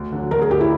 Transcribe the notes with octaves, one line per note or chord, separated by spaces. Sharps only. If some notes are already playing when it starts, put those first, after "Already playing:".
Already playing: D2
D3 F#3
D2 A#4
G#4
D3 F#3 G4
E4